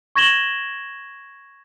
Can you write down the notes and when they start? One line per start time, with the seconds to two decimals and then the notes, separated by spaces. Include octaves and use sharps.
0.16 C#6 G#6 A#6 E7 F#7 G7